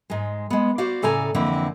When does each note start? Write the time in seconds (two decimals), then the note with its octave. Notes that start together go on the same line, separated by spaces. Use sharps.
0.10 G#2 G#3
0.50 G#3 B3
0.78 F#4 C5 D5 F5
1.02 A2 C#3 A4 D5 G#5 A#5
1.34 F2 D3 E3 A#3 C4 E4